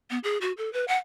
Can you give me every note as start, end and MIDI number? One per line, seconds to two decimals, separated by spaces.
0.10 0.19 59
0.24 0.38 68
0.41 0.52 66
0.57 0.71 69
0.73 0.85 71
0.88 0.98 78